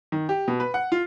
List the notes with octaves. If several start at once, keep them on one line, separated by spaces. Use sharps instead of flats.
D#3
G4
B2
B4
F#5
F4